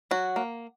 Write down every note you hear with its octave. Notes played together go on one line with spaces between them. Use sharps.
F#3 F#4
A#3